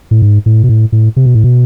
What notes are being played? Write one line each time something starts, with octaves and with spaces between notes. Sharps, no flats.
A2
G#2
A2
B2
A2
A2
C3
B2
A2
B2